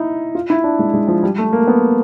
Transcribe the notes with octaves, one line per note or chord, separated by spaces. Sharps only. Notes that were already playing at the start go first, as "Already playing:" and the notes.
Already playing: D#4 E4
F4
E4
D4
G#3
G#3
F3
G3
A3
A#3
B3